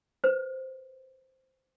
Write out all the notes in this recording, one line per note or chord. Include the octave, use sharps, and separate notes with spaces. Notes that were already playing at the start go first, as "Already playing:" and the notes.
B4 C5